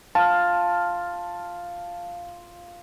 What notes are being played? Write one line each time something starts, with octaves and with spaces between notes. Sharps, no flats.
F4 A5